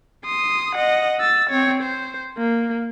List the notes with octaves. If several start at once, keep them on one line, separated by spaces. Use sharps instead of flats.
C6 D#6
D#5 F#5
E6 A6
C4 C#5
C5
A#3